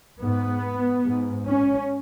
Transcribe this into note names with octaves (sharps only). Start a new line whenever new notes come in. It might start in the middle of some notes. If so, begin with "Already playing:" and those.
G#2 B3
G#2
C#4